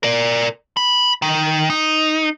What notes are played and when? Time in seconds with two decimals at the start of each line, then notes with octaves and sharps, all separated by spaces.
0.03 A#4 D5
0.77 B5
1.22 D#3
1.70 D#4